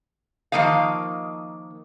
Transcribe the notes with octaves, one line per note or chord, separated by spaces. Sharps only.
D#3 F3 A#3 D#5 F5